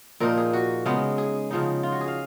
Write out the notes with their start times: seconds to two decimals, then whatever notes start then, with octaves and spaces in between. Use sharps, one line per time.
0.20 A#2 F3 A#3 D#4 A#4
0.37 G#4
0.53 F#4
0.86 C#3 G#3 B3 D#4
1.18 G#4
1.51 C#3 F3 B3 D#4
1.83 F4
1.92 F#4
2.01 G#4
2.08 F5